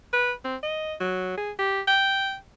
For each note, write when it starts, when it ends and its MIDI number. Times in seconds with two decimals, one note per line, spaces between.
0.13 0.32 71
0.44 0.56 60
0.63 0.94 75
1.00 1.35 54
1.37 1.51 68
1.59 1.81 67
1.87 2.35 79